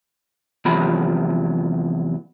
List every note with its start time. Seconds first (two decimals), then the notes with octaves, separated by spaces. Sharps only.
0.65 E2 C3 F3 F#3 B5